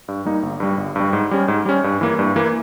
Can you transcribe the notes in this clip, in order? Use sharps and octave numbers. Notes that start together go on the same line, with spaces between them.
G2
G3 A#3 D#4
G1
G2 G3
G1
G2 G3
G#2
G3 C#4
G#2
G3 C#4
G2
E3 A#3
G2
E3 A#3